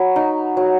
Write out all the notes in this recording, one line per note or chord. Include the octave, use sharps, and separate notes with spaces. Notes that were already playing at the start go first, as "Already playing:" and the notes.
Already playing: F#3 B5
D#4
F#3